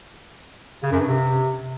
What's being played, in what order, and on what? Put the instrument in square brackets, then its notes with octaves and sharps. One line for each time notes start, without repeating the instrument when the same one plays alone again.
[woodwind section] C#3
F#2
G2
C3